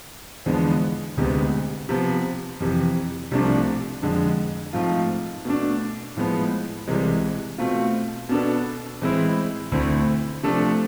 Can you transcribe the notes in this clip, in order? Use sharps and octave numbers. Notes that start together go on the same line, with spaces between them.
E2 D3 F3 G#3 B3
D2 C3 G#3 B3
C3 F3 B3
F2 C3 E3
C2 C3 F3 A3 D4
F2 D3 G#3
G#2 F3 A3 C4 F4
B2 A3 D4
A2 F3 G#3 B3
C2 C3 E3 G#3
B2 A3 C4 F4
B2 B3 D4 A4
A2 E3 G#3 C4 E4
D2 D3 A3 C4 E4
C3 F3 A3 D4 A4